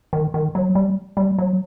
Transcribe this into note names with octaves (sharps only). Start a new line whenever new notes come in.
D#3
D#3
F#3
G3
G3
F#3